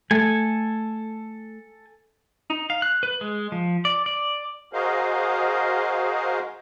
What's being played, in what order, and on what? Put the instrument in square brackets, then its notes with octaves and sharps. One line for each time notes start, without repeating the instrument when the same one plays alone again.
[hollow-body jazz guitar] A3 [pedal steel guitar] A4 G#5
[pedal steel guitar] D#4
F5
F#6
B4
G#3
F3
D5
D5
[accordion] F#4 G#4 A#4 C5 D#5 F5